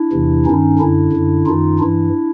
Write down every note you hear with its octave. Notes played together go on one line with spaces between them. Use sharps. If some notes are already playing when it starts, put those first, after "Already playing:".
Already playing: D4 E4
E2 C3 E3
G2 D#3 C#4 D#4
F#2 D3 D4 E4
F#2 D3
F#2 D#3 D#4 F4
G2 E3 D4 E4